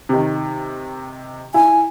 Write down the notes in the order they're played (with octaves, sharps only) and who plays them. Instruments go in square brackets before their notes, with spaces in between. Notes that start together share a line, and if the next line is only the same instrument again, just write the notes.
[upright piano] C3 D#3
[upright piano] E4 [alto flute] G#5